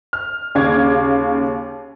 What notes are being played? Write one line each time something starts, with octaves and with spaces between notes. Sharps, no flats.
F6
D#2 C#3 F5 D6 G#6